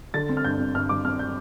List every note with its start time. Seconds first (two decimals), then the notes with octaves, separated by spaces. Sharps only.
0.14 D3 A6
0.29 C4
0.37 F6
0.44 G2 G6
0.59 C4
0.74 G2 F6
0.89 G2 D6
1.05 C4 F6
1.19 G6